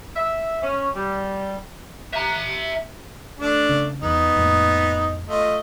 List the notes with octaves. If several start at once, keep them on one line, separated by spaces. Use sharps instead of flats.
E5
C#4
G3
E5 A#5
A3 D4
C#3
E2 B3 D#4
F2 A2 A#3
A3 F4 D#5